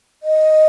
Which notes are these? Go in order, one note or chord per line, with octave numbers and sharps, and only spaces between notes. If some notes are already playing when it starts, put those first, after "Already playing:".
D#5